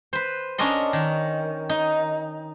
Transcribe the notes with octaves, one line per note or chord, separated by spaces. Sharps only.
B4 C5
C#4 D4 A#4 D#5 C6
D#3
D#4